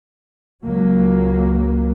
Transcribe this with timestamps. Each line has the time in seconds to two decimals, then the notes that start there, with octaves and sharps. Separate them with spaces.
0.65 C#2 F#3 A#3